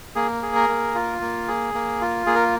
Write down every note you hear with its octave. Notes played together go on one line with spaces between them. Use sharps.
A#3 G#4
G#4
A#4
A#3
F4
A#3
G#4
A#3
F4
A#3 G#4
A#4